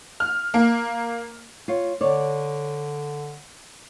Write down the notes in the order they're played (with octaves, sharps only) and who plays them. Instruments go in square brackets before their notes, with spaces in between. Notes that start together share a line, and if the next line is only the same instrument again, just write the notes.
[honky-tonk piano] F6
A#3
[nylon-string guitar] F4 C#5
[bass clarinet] D3 [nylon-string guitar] C#5 D5